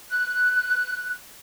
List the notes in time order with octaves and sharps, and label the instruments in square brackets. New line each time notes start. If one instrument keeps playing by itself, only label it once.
[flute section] F#6